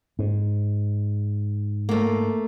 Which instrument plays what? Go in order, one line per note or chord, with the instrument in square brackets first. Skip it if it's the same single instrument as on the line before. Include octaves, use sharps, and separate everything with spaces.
[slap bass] G#2
[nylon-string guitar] A3 A#3